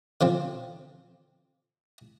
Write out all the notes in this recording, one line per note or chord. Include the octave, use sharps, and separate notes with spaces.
D3 F3 C4